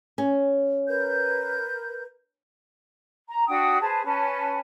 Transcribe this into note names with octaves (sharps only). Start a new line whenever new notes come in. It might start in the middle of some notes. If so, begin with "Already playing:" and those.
C#4
A#4 B4 G6
A#5
D4 F#4 G5 D#6
G#4 B4 C5 A5
C#4 B4 G#5 A5